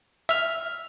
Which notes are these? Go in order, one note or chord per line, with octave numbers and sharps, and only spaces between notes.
E5 F6